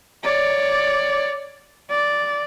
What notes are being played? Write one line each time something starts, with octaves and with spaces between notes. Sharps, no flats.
C#5 D5
D5